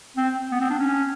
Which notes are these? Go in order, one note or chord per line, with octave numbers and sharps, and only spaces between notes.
C4
B3
C4
D4
C#4